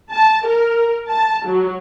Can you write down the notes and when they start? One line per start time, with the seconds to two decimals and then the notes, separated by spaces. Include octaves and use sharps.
0.11 A5
0.47 A#4
1.09 A5
1.48 F#3